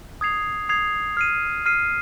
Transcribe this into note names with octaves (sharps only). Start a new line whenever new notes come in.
D#6 G#6 C7 F7
D#6 G#6 C7 F7
F6 C7 D#7
F6 C7 D#7